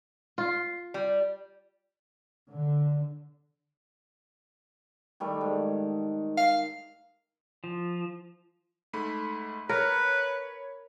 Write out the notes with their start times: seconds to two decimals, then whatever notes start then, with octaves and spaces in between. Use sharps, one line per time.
0.38 F4
0.94 G3
2.51 D3
5.20 D#3 G3 A3
5.41 G#2
6.37 F5
7.64 F3
8.93 G#2 A3 B5
9.69 A#4 B4 C#5 B5